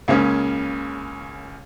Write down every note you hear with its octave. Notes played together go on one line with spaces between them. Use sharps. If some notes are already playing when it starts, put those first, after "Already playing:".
C#2 C#3 A#3 C#4 G#4